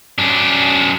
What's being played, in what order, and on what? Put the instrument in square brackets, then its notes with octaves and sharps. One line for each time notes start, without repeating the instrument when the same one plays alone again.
[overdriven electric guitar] F#2 D4